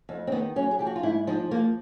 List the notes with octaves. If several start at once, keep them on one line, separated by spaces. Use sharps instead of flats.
F2
C4
D#3 B3
F#3 C#4
G#4
F3 G4
F#4
F4
G#2 E4
F3 D#4
F3 A#3